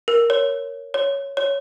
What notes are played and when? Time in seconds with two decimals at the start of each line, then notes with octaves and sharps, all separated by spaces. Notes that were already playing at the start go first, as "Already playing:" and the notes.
0.08 A#4
0.30 C#5
0.94 C#5
1.37 C#5